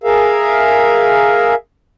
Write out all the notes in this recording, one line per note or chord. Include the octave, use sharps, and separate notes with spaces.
G#4 A#4 E5 F5